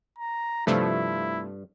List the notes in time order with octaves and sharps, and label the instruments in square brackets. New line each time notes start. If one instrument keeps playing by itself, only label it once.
[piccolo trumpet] A#5
[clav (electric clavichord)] G2 [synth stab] C3 F3 A3 [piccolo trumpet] E4